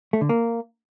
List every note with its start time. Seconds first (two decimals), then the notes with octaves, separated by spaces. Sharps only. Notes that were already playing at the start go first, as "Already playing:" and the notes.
0.13 A3
0.21 D3
0.29 A#3